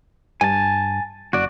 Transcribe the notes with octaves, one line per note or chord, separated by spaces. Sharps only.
G2 G#5 A5
F#1 F#4 D5